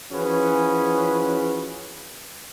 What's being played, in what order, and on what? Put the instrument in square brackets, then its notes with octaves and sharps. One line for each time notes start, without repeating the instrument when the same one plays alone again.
[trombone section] E3 F3 C#4 F#4 G#4 B4